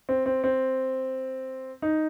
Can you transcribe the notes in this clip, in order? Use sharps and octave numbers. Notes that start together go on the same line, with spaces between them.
C4
C4
C4
D#4